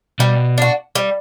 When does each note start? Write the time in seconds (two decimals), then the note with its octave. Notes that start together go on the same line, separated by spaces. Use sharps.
0.19 B2 G3
0.58 D4 F#4
0.95 G3